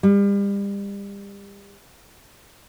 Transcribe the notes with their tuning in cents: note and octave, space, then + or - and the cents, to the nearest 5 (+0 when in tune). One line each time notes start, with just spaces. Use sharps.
G3 +35